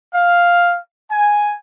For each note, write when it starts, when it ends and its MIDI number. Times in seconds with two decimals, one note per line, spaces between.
0.14 0.78 77
1.10 1.55 80